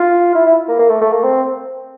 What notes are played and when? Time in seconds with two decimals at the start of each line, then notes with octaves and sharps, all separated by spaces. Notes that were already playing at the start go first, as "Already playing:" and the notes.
Already playing: F4
0.35 E4
0.46 E4
0.68 A#3
0.79 A#3
0.90 A3
1.01 A3
1.12 A#3
1.23 C4